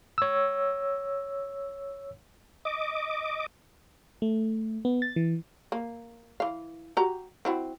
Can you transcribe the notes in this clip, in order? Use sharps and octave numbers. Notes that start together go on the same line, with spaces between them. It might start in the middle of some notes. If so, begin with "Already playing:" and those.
C#5 E6
D#5 D6
A3
B3
A6
E3
A#3
E3 F5
F#4 G4 A#5
C4 E4 F#4